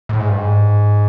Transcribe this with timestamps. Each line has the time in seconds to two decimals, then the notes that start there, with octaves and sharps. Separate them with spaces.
0.09 A2
0.20 G#2
0.29 G2
0.38 G#2